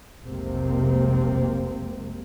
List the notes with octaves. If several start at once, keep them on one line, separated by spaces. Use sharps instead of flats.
F1 B1 C3 G#3 A#3 C4